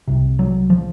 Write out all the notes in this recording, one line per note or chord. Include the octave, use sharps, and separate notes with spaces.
C2 C3
F#3
F3